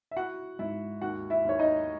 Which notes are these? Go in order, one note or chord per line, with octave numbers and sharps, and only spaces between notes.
E5
E4 F#4 F#5
G#2 E4 E5
D#2 F#4 F#5
E4 E5
D#2 C#5
D#4 D#5